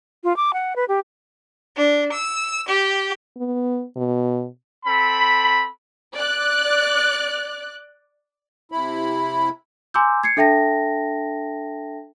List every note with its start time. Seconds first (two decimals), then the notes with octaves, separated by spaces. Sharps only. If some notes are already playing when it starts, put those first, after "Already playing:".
0.24 F4
0.36 D6
0.53 F#5
0.76 B4
0.88 G4
1.77 D4
2.13 E6
2.68 G4
3.37 B3
3.96 B2
4.86 C4 A4 B5
6.15 D5 F#6
8.72 C3 E4 B5
9.94 G#5 A#5 C6 D6 E6 G6
10.23 G#6 C7 C#7
10.37 D4 A4 E5 G5 A5 A#6